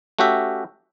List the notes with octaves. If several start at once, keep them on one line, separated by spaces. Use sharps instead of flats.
A3 C#4 F#4 G4 E5